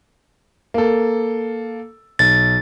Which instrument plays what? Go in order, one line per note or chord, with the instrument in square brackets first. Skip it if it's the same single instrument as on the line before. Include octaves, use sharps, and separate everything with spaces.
[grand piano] A#3 A4
[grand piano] B1 [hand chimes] A6